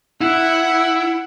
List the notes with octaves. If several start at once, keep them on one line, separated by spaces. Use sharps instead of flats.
E4 F#5